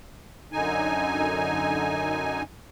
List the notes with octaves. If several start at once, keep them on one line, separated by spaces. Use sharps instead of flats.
F#2 D3 D#4 G#5